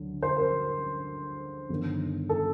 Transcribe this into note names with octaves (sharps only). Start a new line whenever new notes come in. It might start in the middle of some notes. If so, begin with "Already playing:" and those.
Already playing: D2 D3 F#3
C5
A#4
G1 G2 D#3
A4